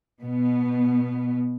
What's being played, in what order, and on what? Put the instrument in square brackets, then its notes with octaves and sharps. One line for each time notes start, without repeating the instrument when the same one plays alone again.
[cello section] B2 B3